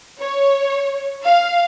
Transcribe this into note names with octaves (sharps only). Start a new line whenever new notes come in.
C#5
F5